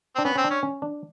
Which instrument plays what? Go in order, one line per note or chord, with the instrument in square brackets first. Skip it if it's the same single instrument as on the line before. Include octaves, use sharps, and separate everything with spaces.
[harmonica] C4 [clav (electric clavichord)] D4
[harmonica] B3 [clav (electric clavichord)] C#4
[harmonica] C4 [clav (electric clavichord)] C#4
[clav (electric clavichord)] D4
[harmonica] C#4
[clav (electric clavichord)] C#4
D4